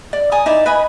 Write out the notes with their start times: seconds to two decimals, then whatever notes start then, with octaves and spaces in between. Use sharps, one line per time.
0.13 D5
0.32 G#5 A#5 D#6
0.46 D#4 E4 D5 E5
0.66 B4 D#5 G#5 B5